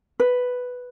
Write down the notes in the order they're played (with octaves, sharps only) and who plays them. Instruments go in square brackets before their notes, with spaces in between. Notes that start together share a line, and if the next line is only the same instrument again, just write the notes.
[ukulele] B4